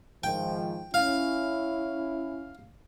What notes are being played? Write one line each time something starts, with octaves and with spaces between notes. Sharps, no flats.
G#2 D#3 F3 G5
C#4 E4 F5